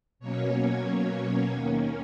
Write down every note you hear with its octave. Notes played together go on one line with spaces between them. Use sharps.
B2 F#3 A#3 C#4 C#5
D#2 D#3 A#3 C#4